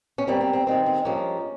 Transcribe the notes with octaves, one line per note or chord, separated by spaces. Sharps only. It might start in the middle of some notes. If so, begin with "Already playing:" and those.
C#4
G#2 G3 A#3 C4
C4
C4
G2 D#3 G#3 C4
C4
G2 F3 G#3 A#3 C#4